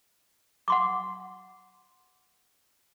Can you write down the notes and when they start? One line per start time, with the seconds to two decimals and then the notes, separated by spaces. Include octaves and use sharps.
0.68 F#5 C6 D6